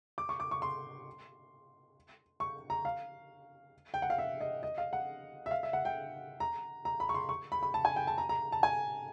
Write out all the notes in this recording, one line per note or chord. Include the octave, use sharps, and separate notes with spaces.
D6
C#6
D6
C#6
C6
C#6
A#5
F5
G5
F#5
F5
E5
D#5
D#5
F5
F#5
E5
F5
E5
F#5
G5
A#5
A#5
B5
C#6
C6
C#6
B5
B5
A5
G#5
G5
A5
A#5
A#5
A5
G#5